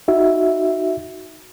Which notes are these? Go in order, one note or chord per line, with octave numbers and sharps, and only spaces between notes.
D#4 F#4 E5